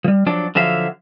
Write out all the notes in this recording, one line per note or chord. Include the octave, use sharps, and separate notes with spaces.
F3 G3
F3 F#3 D4 D5
D3 F3 F#3 F#4 E5 F5